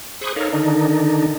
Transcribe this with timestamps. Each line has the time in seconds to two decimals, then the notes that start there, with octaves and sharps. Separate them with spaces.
0.21 G#4 C5 B5 C#6 D#6 F#6
0.36 D#4 A4 A#4 C#5 F5
0.53 D3 D#3 D4 D#4